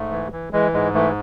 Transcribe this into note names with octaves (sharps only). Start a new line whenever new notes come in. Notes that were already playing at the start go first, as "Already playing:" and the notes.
Already playing: G#2 A3
E3
E3
E3 G#3
G#2 G#3
E3 A3